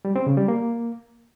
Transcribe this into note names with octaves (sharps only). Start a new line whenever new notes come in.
G3
C4
C#3
G3
A#3